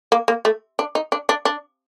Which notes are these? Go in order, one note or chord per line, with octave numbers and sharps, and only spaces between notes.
A#3
A#3
A3
D4
D#4
D4
D4
D4